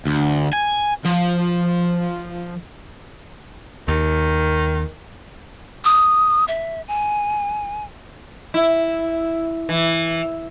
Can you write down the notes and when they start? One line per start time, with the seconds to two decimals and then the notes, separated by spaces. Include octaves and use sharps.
0.05 D2
0.53 G#5
1.05 F3
3.88 D#2 D#3
5.85 D#6
6.48 E5
6.88 G#5
8.54 E4
9.69 E3